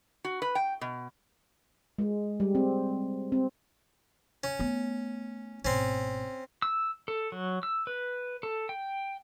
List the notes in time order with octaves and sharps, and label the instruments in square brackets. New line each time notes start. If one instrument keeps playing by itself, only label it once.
[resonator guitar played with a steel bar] F#4
B4
G5
B2
[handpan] G#3
G3
C4
C4
[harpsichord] C#4
[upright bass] A3 B3
[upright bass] G#1 B2 [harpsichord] C4 C#4
[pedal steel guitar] E6
A4
F#3
E6
B4
A4
G5